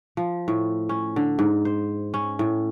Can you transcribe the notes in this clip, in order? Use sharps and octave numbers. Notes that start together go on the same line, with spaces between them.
F3
A2
C#4
D3
G#2
C5
C#4
A2